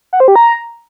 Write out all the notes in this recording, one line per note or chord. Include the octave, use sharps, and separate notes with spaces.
F#5
C5
G4
A#5